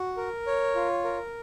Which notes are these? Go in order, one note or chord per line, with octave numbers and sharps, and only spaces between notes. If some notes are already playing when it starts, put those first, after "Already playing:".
Already playing: F#4
A#4
C#5
F4
A#4